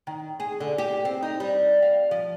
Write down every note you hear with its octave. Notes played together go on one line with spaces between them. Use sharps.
D#3
G#4
D3
G4
C4
D#4
G3
F5
F3